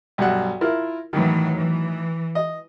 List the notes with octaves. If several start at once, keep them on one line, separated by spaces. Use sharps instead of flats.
B1 G2 F#5
E4 F4 A#4
A2 D#3 E3 F#3
E3
D#5